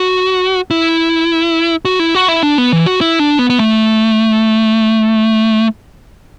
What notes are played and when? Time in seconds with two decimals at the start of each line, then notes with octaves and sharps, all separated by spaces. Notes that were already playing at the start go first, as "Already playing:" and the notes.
Already playing: F#4
0.71 E4
1.85 F#4
1.99 E4
2.15 F#4
2.28 E4
2.43 D4
2.58 B3
2.73 E3
2.86 F#4
3.01 E4
3.20 D4
3.39 B3
3.50 B3
3.59 A3